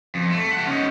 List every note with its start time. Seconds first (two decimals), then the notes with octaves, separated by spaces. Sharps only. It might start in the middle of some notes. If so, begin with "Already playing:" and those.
0.15 F2
0.30 A3
0.53 G4 F#5
0.66 C#4 D#4